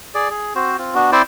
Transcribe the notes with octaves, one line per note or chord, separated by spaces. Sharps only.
G#4 D5
G#4
C4 F#4 C5
C4 F4
B3 D4 F#4
C4 E4 C5 D5